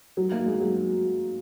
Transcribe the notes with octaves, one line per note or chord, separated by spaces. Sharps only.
F#3
A#3
G#3
F#3